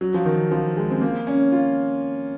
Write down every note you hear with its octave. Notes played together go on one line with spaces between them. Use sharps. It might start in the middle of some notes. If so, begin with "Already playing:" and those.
F#3
F3
D#3
F3
G#3
C4
A#3
C#4
F4